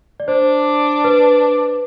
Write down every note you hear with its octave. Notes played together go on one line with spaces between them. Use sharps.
D5
D4 C5
B4